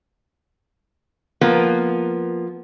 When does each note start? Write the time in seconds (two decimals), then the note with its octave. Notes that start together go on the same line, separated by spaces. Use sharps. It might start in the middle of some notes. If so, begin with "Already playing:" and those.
1.41 F3 A#3 B3